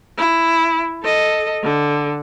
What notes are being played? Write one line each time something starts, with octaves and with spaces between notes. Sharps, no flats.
E4
A4 D#5
D3